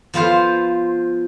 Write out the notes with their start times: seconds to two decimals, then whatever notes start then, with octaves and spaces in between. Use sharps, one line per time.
0.14 F3 B3 F4 C5